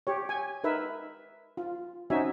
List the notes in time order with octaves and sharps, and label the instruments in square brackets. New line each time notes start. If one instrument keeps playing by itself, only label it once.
[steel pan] G4 C#5
G#5
D#4 A#4 B4 E5
F4
C4 C#4 D#4 F#4 E5 G#5